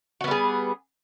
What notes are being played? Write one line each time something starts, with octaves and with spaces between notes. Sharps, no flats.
G3 B3 F#4 G#4